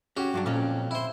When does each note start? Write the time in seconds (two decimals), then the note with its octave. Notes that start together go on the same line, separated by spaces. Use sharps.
0.17 C#4 F#4 G4
0.34 G2 F#3 D4
0.46 F2 A#2 C#4
0.91 E4 C5